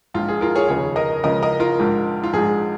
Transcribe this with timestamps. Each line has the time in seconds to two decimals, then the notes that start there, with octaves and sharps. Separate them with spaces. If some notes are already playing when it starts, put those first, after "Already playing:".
0.14 A#1 G#2 F3 F4
0.28 G#4
0.41 F4 A#4
0.55 G#4 C#5
0.68 F1 D#2 C#3 F3 G#4 C#5
0.96 A#4 D#5
1.23 C#2 C#3 F3 A#4 D#5
1.42 A#4 D#5
1.60 F4 A#4
1.79 A#1 G#2 F3
2.24 F4
2.33 A#1 G#2 F3 G#4